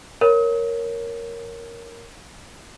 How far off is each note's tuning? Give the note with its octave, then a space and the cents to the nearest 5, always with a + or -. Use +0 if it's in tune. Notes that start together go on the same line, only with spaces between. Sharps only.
A#4 +0 C#5 -5